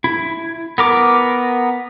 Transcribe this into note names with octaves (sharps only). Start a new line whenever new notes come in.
E4
B3 A#4 D6